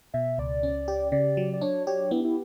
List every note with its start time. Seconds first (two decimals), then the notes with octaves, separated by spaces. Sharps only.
0.14 B2 E5
0.38 C#2 D5
0.63 C#4
0.88 G4
1.12 C#3 D5
1.37 F#3
1.53 D5
1.61 D4 C#5
1.87 G4 C#5
2.11 B3 E4
2.24 E4